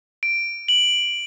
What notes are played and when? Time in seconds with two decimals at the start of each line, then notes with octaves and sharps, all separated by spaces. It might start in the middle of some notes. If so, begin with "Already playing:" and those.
0.23 D7
0.68 F#7